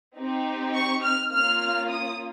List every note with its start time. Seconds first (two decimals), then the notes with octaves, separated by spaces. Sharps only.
0.18 C4 D#4 G4
0.75 C#6
1.03 F6
1.32 A#3 C#4 F4 F6
1.89 D#6